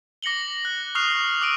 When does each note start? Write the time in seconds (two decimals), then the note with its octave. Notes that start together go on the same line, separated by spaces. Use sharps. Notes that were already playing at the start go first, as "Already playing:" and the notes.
0.22 D6 A#6 C#7 F#7 G7
0.65 F#6
0.95 C#6 D#6 F6 F#6 C7 F7
1.42 D6 E6 D7 D#7